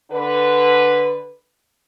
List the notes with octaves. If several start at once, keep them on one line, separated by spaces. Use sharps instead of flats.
D3 B4